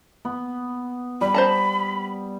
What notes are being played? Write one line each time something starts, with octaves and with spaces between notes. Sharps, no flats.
B3
G3 B5
C5 A5 A#5